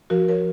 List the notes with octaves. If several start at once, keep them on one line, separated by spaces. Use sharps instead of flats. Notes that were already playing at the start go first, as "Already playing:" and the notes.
F3 F#4 A#4
F3 A#4 C#5